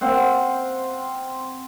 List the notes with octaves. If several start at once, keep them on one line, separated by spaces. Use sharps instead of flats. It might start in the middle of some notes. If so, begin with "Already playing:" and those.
C4 F5 F#5